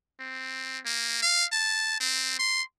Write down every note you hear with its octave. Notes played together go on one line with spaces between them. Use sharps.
C4
A#3
F5
A5
C4
C6